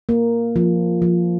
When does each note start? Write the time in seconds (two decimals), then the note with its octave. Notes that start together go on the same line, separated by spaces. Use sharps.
0.09 A#3
0.56 F3
1.02 F3